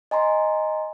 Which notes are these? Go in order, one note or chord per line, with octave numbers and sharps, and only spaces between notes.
D#5 G#5 A#5 C6